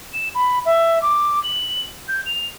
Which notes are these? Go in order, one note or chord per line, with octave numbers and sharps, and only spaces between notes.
E7
B5
E5
D6
F#7
G6
F7